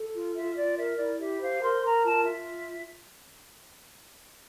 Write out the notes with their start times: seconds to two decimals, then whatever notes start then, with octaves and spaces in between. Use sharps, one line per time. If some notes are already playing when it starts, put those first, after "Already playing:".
Already playing: A4
0.13 F4
0.34 F4 E5
0.55 F4 D5
0.77 A#4 E5
0.98 E4 D5
1.19 G4 E5
1.41 C5 F5
1.61 A#4 C6
1.82 A#4 A#5
2.05 F4 A5
2.25 F4 E5